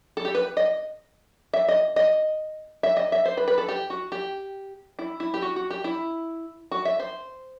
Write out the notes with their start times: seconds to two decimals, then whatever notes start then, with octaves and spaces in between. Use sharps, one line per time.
0.17 A4
0.25 G4
0.35 B4
0.57 D#5
1.54 E5
1.69 D#5
1.96 D#5
2.83 E5
2.97 D#5
3.12 E5
3.25 C5
3.37 B4
3.48 B4
3.58 A4
3.69 G4
3.90 F#4
4.12 G4
4.99 E4
5.20 E4
5.34 G4
5.42 F#4
5.56 F#4
5.70 G4
5.84 E4
6.72 F#4
6.85 E5
7.00 C5